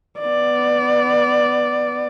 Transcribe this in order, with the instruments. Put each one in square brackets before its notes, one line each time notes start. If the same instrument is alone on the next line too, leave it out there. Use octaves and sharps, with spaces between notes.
[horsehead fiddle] B3 D5